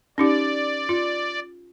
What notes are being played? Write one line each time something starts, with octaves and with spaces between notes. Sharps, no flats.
C#4 D#4 G4 D5
F4